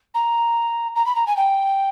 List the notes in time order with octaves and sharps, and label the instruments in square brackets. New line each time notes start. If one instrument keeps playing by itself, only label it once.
[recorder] A#5
A#5
B5
A#5
G#5
G5